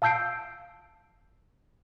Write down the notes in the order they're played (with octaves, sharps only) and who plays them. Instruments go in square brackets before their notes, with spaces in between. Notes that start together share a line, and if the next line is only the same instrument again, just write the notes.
[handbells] F5 A5 E6 G6 C7 D7